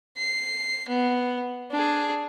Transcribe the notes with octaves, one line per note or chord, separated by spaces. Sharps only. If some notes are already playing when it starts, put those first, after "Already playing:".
C7
B3
D4 G#4